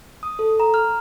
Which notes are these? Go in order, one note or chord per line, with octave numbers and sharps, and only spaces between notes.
D#6
A4
A#5
F6